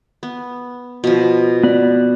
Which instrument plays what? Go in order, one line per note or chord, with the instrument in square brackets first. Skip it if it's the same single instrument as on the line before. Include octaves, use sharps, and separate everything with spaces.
[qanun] B3
B2 F3
[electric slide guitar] B3 D5